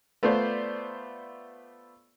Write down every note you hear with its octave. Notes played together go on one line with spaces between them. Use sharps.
A3 B3 F4 C5 D5